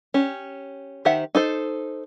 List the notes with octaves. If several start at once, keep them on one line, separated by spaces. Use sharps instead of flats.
C#4 G4
D#3 G4 C5 E5 F#5
D#4 A4 C5